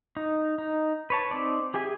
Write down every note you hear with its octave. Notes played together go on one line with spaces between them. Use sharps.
D#4
D#4
B4 C#5 A5
C4 D#4 D5
G4 G#4 E5 G#5